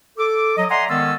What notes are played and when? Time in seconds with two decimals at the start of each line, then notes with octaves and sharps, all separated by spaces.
0.18 A4 D6
0.57 F#3 D#5
0.70 D5 E5 F#5 G#5 A#5 C6
0.89 D#3 G#3 B3 C#4 A4 E6